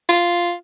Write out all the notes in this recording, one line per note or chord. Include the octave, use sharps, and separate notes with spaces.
F4